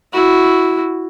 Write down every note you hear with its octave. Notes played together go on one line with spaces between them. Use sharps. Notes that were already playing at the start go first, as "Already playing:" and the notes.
E4 F#4